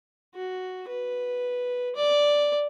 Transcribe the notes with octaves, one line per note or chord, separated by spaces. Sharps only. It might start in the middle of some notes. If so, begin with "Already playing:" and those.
F#4
B4
D5